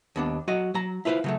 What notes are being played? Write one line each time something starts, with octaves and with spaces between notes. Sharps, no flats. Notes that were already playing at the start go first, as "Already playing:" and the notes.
D#2 B3 D4
F#3 F#4 D#5
F#3 A#5
E4 F4 B4 C5 F5
C#3 F#3 A3